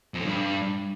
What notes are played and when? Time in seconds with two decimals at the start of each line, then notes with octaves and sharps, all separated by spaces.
0.14 F2
0.20 A2
0.25 G2